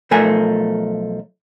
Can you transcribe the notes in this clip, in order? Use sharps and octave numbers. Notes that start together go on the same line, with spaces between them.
B1 F3 A3 A#4 G#5